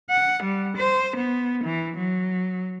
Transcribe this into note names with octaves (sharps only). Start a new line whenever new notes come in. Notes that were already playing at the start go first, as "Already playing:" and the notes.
F#5
G3
C5
B3
E3
F#3